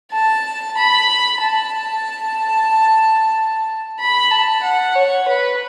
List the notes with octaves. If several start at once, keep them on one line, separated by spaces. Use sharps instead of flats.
A5
B5
A5
B5
A5
F#5
C#5
B4